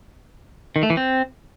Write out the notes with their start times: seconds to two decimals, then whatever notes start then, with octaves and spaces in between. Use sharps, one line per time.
0.76 D#3
0.83 A3
0.90 E3
0.97 C4